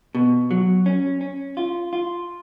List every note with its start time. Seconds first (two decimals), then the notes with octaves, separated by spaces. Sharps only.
0.15 B2
0.51 F#3
0.86 C#4
1.21 C#4
1.57 F4
1.93 F4